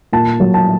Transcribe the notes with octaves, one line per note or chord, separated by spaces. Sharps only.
A#2 A5
F#3
A5